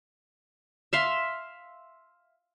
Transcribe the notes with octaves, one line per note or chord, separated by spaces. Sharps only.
E5 F5 C6